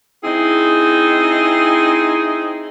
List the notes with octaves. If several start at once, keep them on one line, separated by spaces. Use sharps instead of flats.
C4 D#4 E4 G#4